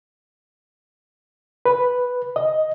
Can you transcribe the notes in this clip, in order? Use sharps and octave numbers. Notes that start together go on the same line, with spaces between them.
B4
D#5